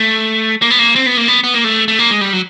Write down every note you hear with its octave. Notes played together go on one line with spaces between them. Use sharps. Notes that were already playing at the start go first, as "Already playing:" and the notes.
Already playing: A3
A#3
B3
A#3
C4
B3
A#3
B3
B3
A#3
A3
A3
A#3
G#3
G3
F#3